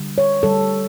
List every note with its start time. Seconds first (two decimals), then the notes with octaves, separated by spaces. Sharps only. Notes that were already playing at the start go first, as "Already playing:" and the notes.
Already playing: D3 G3
0.18 C#5
0.43 D3 G3 A4